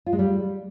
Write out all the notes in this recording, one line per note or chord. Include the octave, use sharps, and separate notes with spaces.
F4
G#3
G3